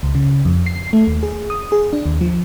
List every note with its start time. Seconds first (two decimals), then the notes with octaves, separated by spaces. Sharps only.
0.03 C#2
0.15 C#3
0.45 F2
0.66 C7
0.93 A3
1.07 D#2
1.23 G#4
1.50 D#6
1.72 G#4
1.93 D4
2.06 D#2
2.21 F3